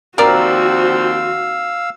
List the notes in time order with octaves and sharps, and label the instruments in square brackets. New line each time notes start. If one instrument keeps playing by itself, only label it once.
[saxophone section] D#2 F3 C4 [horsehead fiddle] F#4 [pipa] A#4 D5 [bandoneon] F5 E6